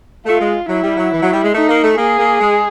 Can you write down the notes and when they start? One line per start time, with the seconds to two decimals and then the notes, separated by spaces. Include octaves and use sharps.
0.26 A3 F4
0.41 G#3
0.69 F#3 E4
0.83 G3
0.97 F#3
1.12 E3
1.23 F#3
1.33 G3
1.44 G#3
1.54 A3 D#4
1.69 A#3
1.84 A3
1.98 A#3 G#4
2.19 A#3
2.41 G#3